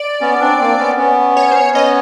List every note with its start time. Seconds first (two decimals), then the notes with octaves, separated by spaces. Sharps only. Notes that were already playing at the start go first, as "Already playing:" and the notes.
Already playing: D5
0.21 B3 C#4
0.41 C4 D4
0.59 A#3 C4
0.78 B3 C#4
0.98 B3 C#4
1.37 C#5
1.51 C5
1.56 C#5
1.74 B3 C#4 D#5